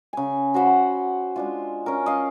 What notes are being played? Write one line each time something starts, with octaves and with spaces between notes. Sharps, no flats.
C#3 G#5
F#4 C5 F#5 B5
G#3 D4 F4
C#4 A#4
D#5 F5